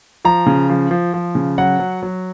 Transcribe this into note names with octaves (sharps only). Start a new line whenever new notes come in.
F3 A#5
C#3
F3
F3
F3
C#3
F#3 F#5
F#3
F#3